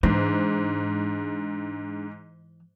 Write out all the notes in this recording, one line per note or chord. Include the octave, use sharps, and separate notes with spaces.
G#2 E3 D4 G#4 C5